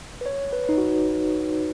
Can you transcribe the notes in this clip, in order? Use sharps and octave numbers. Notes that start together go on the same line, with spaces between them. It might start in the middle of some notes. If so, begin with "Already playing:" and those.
B4
C#5
B4
D#4
F#4